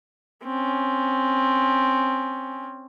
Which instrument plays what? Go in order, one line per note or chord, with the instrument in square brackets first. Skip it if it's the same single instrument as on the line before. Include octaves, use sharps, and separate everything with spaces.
[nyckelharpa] C4 C#4